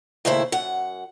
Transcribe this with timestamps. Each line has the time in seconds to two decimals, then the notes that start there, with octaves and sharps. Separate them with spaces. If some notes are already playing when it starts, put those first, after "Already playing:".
0.25 D#2 A2 C#3 A3 E4 C5
0.52 F#2 F#5